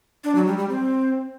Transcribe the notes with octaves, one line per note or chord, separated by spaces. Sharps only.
D4
F#3
G3
G3
C4